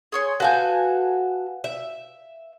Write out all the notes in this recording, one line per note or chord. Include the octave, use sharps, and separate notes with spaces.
G#4 C#5 C6
F#4 A4 B4 F5 G#5 G6
E5